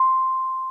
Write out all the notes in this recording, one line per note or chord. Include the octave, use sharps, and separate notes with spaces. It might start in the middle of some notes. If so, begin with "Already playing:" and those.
Already playing: C6